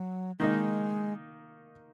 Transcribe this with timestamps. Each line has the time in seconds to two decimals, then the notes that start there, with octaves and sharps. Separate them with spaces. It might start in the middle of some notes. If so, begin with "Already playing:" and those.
Already playing: F#3
0.39 D#3 G#3 A#3 D#4